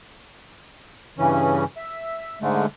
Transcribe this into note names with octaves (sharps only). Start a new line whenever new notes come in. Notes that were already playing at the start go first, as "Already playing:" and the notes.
G2 C#3 E3 C#4
E5
G#2 D3 G#3 A3